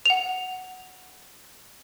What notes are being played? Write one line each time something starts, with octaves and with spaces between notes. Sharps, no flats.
F#5 F7